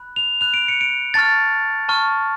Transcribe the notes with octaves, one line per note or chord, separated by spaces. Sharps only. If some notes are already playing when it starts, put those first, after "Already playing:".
Already playing: B5 F#6
F7
B5 F#6 F7
D7
C#7
D7
A5 C#6 F6 A6
A5 C#6 F6